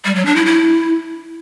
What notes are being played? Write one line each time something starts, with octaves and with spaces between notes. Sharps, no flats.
G3
F#3
D4
E4
E4